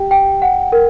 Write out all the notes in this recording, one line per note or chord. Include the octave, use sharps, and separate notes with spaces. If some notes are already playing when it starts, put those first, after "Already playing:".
Already playing: G4 G5
G5
F#5
A#4